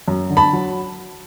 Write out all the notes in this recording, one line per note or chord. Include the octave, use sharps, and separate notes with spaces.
F#2
D3
A5 B5
F#3